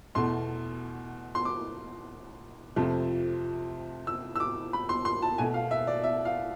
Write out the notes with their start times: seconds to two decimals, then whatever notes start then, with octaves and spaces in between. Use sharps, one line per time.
0.15 E2 B2 A3 C6
1.35 C6
1.45 D6
2.76 F2 C3 F3 A3
4.07 E6
4.35 E6
4.40 D6
4.73 B5
4.89 C6
5.05 C6
5.22 A5
5.38 B2 A3 G#5
5.54 F5
5.71 E5
5.87 D5
6.03 E5
6.25 F5